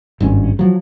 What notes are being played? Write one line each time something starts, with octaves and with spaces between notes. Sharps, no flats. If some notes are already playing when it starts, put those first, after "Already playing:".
G#1 G2 C#4
F3 F#3